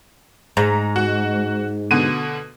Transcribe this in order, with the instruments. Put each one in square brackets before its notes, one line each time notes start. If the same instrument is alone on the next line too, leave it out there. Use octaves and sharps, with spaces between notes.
[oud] G#2 [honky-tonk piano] A#5
[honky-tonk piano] F#4
B2 D3 D#7